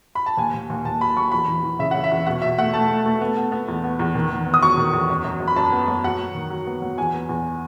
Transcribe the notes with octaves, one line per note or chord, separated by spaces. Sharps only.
B5
A5
D#2 G#5
D#2
D#2
D#2 A5
F#3 B5
F#3 C#6
E2 B5
E3
E3
C#3 E5
C#3 F#5
E5
E2
B2 F#5
B2 E5
A3 F#5
A3 A5
A3
A3
B3
B3
B3
E2
B3
E2
D#3
D#3
B3
D#6
F#3 C#6
D#3
E2
F#2
F#2
F#2
B5
F#2 A5
B3
F#2
F#3 F#5
F#3
D#3
F#3
B3
F#3
E2 G#5
B3
E2